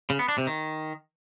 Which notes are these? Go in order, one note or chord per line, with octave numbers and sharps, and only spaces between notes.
C#3
B3
D4
C3
D#3